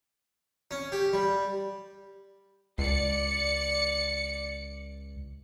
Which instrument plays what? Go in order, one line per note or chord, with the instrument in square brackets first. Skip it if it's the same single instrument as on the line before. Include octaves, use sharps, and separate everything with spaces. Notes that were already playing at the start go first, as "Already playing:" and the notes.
[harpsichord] C#4
G4
G3
[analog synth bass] C#2 [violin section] D5 C#7